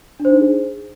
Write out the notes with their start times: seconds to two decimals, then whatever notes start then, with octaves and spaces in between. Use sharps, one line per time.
0.20 D4
0.25 C5
0.30 D#4
0.35 D4
0.41 G#4